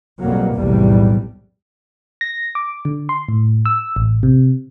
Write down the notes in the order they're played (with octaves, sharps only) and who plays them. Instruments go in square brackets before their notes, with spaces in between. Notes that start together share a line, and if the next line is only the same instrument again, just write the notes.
[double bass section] B1 F2 B2 F#3 G3 A#3
B1 E2 A2 C3 G3
[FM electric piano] A#6
D6
D3
C6
A2
E6
A1
C3